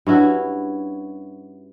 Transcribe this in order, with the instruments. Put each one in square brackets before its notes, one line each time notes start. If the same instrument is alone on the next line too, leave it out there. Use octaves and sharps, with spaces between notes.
[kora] G2 C#4 E4 F#4